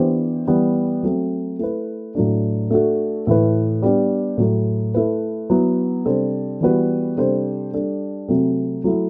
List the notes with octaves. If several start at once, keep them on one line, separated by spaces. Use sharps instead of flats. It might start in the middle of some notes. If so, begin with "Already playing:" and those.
Already playing: E3 B3 D4 G4 C5
E3 G3 B3
F#3 A3 C4
A3 E4 B4
A2 F#3 A3 D4
A3 D4 F#4 A4
A2 E3 A3 E4 B4
G3 B3 D4 G4
A2 F#3 A3
A3 E4 B4
F#3 B3 E4
C3 G3 D4 A4 C5
E3 G3 B3 F#4 B4
C3 G3 D4 A4 C5
G3 D4 A4
C3 F#3 A3 C4
F#3 A3 E4